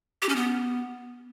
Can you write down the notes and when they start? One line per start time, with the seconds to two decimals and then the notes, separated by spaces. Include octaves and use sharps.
0.22 G4
0.29 C#4
0.36 B3